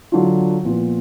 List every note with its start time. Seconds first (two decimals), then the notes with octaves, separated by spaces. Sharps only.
0.12 D3 F#3 D4 F4
0.65 A#2 F3 B3 F4